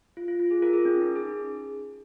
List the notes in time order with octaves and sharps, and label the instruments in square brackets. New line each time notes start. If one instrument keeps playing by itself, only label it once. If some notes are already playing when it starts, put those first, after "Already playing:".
[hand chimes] F4
F4
F4
G#4
F4 A#4
G#4
C#4
D#4
G#4